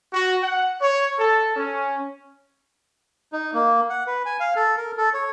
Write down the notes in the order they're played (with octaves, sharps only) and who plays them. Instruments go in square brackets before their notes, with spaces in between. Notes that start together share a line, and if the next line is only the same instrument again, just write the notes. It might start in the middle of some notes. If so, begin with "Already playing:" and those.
[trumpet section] F#4
F#5
C#5
A4
C#4
[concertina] D#4
A#3
F#5
B4
G#5
F5
A4
A#4
A4
C#5